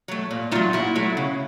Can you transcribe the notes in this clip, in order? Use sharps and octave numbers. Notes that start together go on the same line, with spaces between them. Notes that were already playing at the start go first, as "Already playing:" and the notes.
F#3 A3
A#2
F#3 A3 D#4 F4
A#2 E4 F#4
F#3 A3
C#3